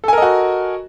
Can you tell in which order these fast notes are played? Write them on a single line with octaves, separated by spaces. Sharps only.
A4 G#5 A#4 D#5 F#4